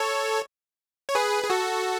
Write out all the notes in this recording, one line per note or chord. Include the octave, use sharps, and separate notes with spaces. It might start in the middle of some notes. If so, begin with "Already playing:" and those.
Already playing: A4 C#5
C#5
G#4 B4
G#4
F#4 A4